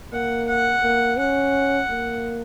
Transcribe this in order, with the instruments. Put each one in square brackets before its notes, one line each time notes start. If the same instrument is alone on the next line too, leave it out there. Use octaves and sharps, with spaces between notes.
[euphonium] A#3 [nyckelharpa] F#5
[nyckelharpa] F#5
[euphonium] A#3
[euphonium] C#4 [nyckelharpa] F#5
[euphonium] A#3